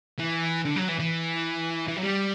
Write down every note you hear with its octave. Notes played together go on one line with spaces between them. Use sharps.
E3
D3
F#3
E3
E3
E3
F#3
G3